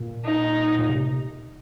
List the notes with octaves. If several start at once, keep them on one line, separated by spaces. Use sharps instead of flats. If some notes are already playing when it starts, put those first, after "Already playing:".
Already playing: A#2
D#4
A#2
C3